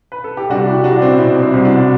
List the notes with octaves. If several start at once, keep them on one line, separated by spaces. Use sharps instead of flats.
B4
A4
G4
C2 D4 F#4
E4 G4
G3 D4 F#4
C4 E4
B2 C4 E4
C4 E4
C2
D4 F#4